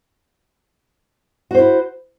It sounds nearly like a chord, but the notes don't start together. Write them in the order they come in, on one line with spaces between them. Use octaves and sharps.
F#4 C5 E4